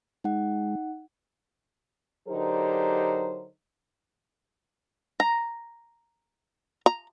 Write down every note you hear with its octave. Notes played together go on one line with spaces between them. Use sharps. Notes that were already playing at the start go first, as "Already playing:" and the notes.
G#3 D#4 F#5
D3 F#3 D#4 G4 A#4 C5
A#5
A#5